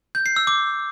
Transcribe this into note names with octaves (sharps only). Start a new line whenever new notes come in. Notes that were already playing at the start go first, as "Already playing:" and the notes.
G6
C7
E6
D6